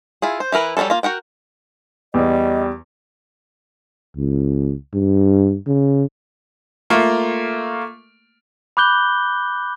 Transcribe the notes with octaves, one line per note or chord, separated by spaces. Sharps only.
E4 F4 G#4
C5
E3 E4 A#4 B4
F#3 G3 D#4 G#4 A4
A#3 F4
F#4 A#4 F#5 G5
E2 G3 D#5
C#2
G2
C#3
A3 A#3 F4
B5 D6 F#6 G6 G7